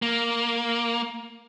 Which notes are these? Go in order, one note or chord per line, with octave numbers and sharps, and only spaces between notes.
A#3